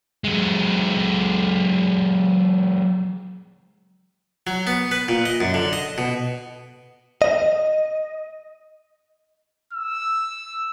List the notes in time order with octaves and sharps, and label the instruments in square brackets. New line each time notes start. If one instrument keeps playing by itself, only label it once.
[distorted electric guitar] F#3 G#3
[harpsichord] F#3
B3
B4
A#2
D#5
F#2
D3
D#5
B2
[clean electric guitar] D#5
[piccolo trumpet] E6